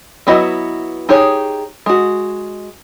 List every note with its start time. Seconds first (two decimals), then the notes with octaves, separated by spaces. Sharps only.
0.27 F#3 B3 E4 F#4 D#5
1.09 D#4 G4 G#4 C#5
1.86 G#3 F#4